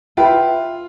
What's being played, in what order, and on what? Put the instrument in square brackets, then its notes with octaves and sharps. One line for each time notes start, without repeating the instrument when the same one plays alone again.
[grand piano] F4 [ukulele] B4 E5 G5 B5